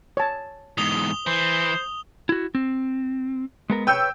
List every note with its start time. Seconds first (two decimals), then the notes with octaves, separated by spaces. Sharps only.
0.17 C#5 A5
0.78 E2 G#2 D#6 F7 G7
1.27 E3 C5
2.29 E4 F#4
2.55 C4
3.70 G#3 B3 A#4
3.87 B4 C#5 G5 E6 G6